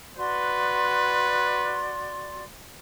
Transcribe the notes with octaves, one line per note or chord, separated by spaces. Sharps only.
F#4 B4 D5 C6